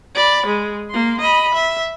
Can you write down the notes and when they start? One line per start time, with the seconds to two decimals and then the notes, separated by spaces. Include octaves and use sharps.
0.15 D5 B5
0.46 G#3
0.90 A#3 C6
1.20 D#5 B5
1.54 E5